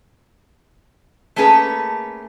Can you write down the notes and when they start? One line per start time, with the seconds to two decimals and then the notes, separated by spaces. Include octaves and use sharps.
1.36 A3 A#3 C#4 G#4 A4 B4